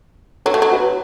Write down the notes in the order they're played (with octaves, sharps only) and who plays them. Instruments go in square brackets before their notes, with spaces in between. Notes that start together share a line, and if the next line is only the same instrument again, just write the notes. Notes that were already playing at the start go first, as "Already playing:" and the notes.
[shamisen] F#3 [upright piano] A4 C#5
[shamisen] A3
F#3
[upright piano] F#4 B4